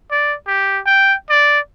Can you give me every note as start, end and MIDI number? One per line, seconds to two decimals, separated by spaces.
0.11 0.35 74
0.48 0.80 67
0.86 1.15 79
1.30 1.60 74